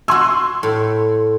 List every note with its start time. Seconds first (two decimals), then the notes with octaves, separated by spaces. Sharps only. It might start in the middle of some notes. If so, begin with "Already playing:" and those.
0.08 F#4 G#5 C6 C#6 E6
0.63 A2